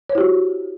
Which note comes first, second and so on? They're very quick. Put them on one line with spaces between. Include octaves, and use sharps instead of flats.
C#5 C5 E4 G4 F#4